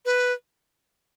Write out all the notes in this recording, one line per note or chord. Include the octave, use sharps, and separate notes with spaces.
B4